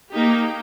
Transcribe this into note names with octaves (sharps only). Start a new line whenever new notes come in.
A#3 D#4 G4